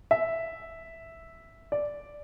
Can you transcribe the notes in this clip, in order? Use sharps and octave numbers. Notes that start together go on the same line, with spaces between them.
E5
D5